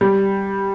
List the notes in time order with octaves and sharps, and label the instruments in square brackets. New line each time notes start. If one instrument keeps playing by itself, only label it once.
[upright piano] G3